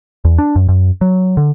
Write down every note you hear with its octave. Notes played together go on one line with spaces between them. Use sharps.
E2
D4
F#2
F#2
F#3
D3